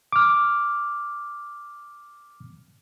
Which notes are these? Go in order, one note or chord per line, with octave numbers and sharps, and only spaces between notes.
D6 F6